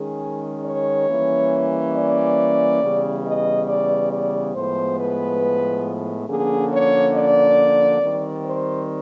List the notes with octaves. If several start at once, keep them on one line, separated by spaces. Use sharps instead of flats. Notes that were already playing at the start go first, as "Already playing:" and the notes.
Already playing: D#3 G#3 C#4 G#4
C#5
E3 G3 A#3 C#4
D5
C#3 E3 G3 B3
D#5
D5
D5
A2 F3 G#3 B3 C5
B4
D3 F3 A#3 C#4 G#4
C#5
D5
D#3 G3 C4
C5